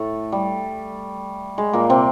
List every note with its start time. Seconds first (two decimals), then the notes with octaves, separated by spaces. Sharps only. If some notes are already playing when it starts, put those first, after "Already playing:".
Already playing: A2 A3
0.32 G3
1.58 G#3
1.73 A#2 A#3
1.90 C3 C4